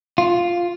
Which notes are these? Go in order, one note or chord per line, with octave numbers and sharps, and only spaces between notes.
F4